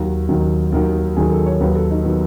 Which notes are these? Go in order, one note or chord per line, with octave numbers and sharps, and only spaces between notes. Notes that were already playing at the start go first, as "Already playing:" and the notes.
Already playing: D#2 D#3 F#3 F#4
D#2 D#3 F#3
D#2 D#3 F#3
D#2 D#3 F#3 G#4
A4
C#5
D#2 D#3 F#3 B4
A4
D#4
D#3 F#3 B3